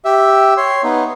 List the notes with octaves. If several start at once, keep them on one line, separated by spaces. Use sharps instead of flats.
G4 E5
C#5 C6
B3 D#4